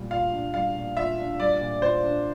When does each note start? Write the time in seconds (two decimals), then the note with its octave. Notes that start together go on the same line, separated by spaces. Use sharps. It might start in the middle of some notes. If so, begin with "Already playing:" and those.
Already playing: A#2 G3
0.11 F4 F5
0.32 D4
0.54 G3 F5
0.75 A#2
0.97 F4 E5
1.18 D4
1.39 G3 D5
1.61 A#2
1.82 F4 C5
2.04 D4